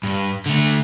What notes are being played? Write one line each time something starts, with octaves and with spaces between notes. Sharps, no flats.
G2
D3 A3